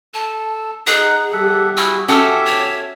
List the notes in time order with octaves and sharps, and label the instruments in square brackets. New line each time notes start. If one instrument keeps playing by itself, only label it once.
[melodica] A4 [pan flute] A5
[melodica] D#4 F#5 [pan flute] G#4
[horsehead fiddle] G3 G4 [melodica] A4 E5 F#5
[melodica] E4 F#4 G#4 [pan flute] E6
[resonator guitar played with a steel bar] C#4 F#4 A4 [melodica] G4 D6 [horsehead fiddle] E5 [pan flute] E6
[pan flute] C#5